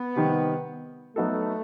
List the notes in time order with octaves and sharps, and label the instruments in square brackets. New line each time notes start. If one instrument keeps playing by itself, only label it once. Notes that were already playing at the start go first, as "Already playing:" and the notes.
Already playing: [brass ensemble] B3
[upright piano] C3 D#3 G3
[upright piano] F#3 B3 D#4 F#4 A4 [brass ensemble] A3